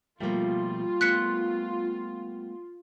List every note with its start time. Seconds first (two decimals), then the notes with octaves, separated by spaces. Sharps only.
0.21 B2 F3 G3 A3 A#3 F4
1.01 A3 B3 C6 F#6 B6 C#7